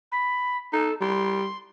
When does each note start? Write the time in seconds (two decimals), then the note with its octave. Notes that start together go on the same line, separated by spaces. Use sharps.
0.12 B5
0.73 D#4 A4
1.01 G3 C6